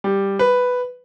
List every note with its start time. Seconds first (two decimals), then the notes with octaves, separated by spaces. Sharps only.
0.04 G3
0.39 B4